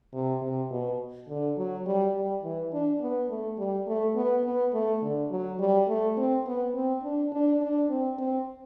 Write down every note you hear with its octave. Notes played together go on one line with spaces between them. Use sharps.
C3
C3
B2
D3
F#3
G3
G3
E3
D4
B3
A3
G3
A3
B3
B3
A3
D3
F#3
G3
A3
C4
B3
C4
D4
D4
D4
C4
C4